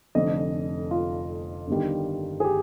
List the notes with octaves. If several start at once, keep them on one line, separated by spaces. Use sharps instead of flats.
F1 F2 D3 D#5
F4
G1 G2 D#3 G3
G#4
G4